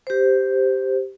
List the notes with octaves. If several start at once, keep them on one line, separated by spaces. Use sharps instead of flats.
G4 C5